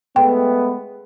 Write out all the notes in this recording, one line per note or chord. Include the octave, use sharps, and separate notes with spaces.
G#3 A3 B3 G5